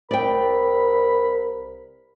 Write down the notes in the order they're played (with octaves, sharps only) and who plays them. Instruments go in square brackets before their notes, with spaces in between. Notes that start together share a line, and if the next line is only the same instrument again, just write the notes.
[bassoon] C2 [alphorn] A#4 [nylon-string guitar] D5 G5 [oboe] B5